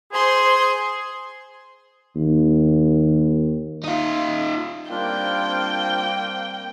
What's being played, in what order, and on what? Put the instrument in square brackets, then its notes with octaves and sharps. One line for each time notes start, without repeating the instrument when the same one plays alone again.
[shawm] G#4 [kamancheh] C5 C6
[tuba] D#2
[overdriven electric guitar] D#4 F4
[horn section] G3 A#3 C4 [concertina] D4 F4 [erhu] G5